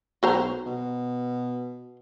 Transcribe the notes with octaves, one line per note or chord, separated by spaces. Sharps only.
B1 F#4 C5 A#5
B2